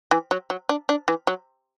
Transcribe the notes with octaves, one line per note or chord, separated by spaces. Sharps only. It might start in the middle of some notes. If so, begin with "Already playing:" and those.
E3
F#3
F#3
D4
D4
E3
F#3